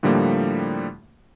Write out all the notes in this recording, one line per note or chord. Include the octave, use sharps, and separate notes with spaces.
A2 D3 F3 G3 A#3